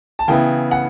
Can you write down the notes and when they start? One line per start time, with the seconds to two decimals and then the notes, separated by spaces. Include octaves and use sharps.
0.19 A5
0.28 C#3 E3 B3 E4 G5
0.71 F#5